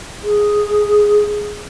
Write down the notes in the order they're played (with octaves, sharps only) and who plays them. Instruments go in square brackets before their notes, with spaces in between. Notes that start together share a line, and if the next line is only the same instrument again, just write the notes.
[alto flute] G#4